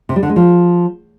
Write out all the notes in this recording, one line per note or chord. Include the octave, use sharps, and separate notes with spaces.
C3
G3
D3
G#3
F3